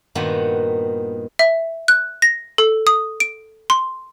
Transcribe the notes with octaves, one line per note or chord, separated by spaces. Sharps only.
G2 A#2 D#3 B3 F#4
E5
F#6
A#6
A4
D#6
D7
C6